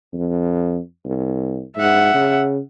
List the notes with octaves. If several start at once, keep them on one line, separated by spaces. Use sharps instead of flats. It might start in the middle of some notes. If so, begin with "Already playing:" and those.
F2
C2
G#2 E5 F#5
C#3